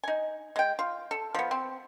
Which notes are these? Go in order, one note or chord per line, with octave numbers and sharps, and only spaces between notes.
D#4 G#5
G#3 G5
F4
A4
F3 B3
C4